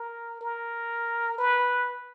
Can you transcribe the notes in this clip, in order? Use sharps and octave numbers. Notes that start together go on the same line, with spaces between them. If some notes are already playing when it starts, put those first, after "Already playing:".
Already playing: A#4
A#4
B4